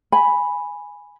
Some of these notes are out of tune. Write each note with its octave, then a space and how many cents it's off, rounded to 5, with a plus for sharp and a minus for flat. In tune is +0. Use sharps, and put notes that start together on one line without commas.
G#5 -5 B5 +0